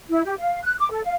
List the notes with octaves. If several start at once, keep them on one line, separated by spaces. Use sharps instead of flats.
E4
G4
F5
F#6
D6
A4
F5